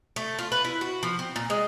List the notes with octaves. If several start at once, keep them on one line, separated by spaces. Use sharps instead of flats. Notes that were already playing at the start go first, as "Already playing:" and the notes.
A3
F4
B4
E4
F#4
F3
C4
A#2
G#3